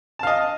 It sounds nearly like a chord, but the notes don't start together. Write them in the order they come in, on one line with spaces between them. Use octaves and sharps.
A5 F5 D#5